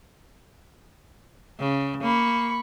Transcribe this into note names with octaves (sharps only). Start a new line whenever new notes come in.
C#3
A#3 B5 C#6